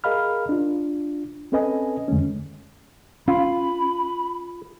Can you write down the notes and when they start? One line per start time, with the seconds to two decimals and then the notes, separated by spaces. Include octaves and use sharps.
0.04 G#4 A#4 D#5 F5 B5 F6
0.49 D4 F4
1.52 C4 C#4 A4 B4 D#5 G#5
2.08 F2 D3 G#3 A3 C#4
3.28 C#4 F4 B5